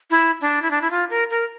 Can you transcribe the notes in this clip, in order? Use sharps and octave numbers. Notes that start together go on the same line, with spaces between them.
E4
D4
E4
D4
E4
F4
A#4
A#4